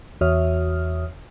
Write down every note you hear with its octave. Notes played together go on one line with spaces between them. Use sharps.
E2 F#4 C#5 E5 D#6 F6